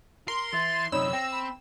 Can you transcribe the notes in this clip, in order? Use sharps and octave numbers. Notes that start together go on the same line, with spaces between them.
A#4 C6
E3 E4 A6
F#2 C3 D#4 C#5 D5 B5 E6
C4 G5 A#6
B5